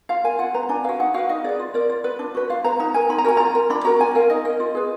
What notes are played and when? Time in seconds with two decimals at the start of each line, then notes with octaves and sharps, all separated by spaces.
0.09 F4 F5
0.24 A#4 G#5
0.39 F4 F#5
0.54 B4 A#5
0.69 D4 G#5
0.84 F#4 B4 F5
0.99 D#4 F#5
1.14 F#4 B4 F5
1.29 D#4 D#5
1.44 G#4 B4 D5
1.59 F4
1.74 A#4 D5
1.90 F4
2.04 B4
2.19 D4
2.35 F#4 B4
2.50 F4 F5
2.64 B4 A#5
2.80 D#4 A#5
2.94 A#4 G#5
3.09 D#4 B5
3.18 A#5
3.25 F#4 A#4 G#5
3.37 F4 A#5
3.55 A#4
3.70 D4 B5
3.85 F#4 A#4 A#5
4.00 F4 G#5
4.15 A#4 F5
4.30 D#4 D#5
4.45 A#4 D#5
4.60 F4
4.75 G#4 B4